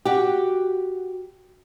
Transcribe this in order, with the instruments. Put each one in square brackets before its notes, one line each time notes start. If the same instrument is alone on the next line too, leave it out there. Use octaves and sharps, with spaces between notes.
[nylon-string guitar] F#4 G4